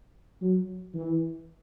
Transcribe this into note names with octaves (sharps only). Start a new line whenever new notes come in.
F#3
E3